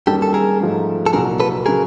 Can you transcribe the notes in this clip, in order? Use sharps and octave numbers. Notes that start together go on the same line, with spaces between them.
F#2 D#3 G3 A#3 C#4 G4 A4
A4
G#4 A#4
G#2 F3 A3
A4
C2 A#2 F#3 G#4 A#4
A4 B4
C#3 F#3 G#4 A#4